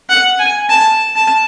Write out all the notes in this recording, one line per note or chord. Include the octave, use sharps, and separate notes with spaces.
F#5
G#5
A5
A5